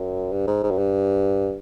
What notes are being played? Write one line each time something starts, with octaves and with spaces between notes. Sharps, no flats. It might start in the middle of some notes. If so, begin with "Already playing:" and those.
Already playing: F#2
G2
G#2
G#2
F#2
G2